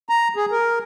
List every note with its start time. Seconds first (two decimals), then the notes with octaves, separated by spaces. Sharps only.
0.09 A#5
0.36 G#4
0.51 A#4